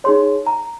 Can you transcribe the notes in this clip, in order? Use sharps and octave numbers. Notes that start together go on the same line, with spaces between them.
D#4 G#4 C#5 C6
A#5